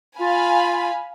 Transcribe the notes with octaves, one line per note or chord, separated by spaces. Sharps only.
F4 F5 G#5 B5